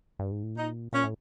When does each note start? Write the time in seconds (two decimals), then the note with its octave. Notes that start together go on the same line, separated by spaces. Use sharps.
0.19 G2
0.32 G#2
0.43 A2
0.55 A#2 D#4
0.93 A#2 C#4
1.04 A2